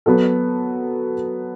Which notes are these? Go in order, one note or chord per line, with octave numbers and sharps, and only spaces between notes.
F#3 B3 F#4 A4